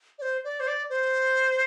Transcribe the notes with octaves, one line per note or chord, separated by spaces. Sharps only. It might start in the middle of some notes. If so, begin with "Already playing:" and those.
D5
C5
D5
C5
D5
C5